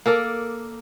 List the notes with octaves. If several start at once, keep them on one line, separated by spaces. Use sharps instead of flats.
A#3 A4 A#4 D5